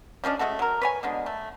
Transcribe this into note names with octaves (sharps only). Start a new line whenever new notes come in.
F3 G#3 C#4 D4
G#3 A3 F#4 A4
F#3 A#4
B4 C#5 G#5
B2 D3 G#3
A3